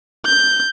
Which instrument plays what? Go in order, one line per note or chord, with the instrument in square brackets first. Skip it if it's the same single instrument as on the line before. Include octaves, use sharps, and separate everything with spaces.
[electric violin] G6